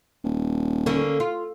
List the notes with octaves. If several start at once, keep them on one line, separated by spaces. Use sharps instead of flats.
D#1
D3 A#3 C#4
F4